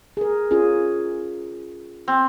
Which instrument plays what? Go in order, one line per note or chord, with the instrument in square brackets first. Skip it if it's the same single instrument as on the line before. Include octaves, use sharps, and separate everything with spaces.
[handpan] G#4 A#4
C#4 F4 G#4
[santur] C4